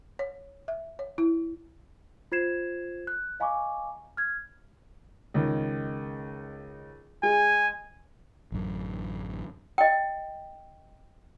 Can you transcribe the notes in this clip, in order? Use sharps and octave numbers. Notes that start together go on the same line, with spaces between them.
C#5
E5
C#5
E4
F4 C5 G#6 C7 E7
F#6
D#5 F5 G#5 A#5 C#6 D6
F6 G#6
C#2 D#3
G#3 G#5
A1 F#2
D#5 G5